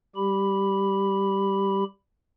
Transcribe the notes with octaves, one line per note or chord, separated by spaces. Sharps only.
G3 G4 B5